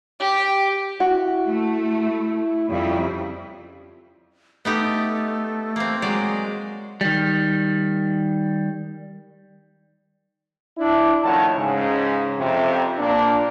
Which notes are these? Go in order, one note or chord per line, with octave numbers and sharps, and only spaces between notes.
G4
E4 F#4
A3
F2 C#3 G3 E4
A3 B3 D#4 G4
A#3 C4
F#3 G#3 D5
D#3 G3
D4 E4
A2 D#3 F3 C#5 F#5 A5
G#2 C#3
F2 C3
A#2 A#3 D4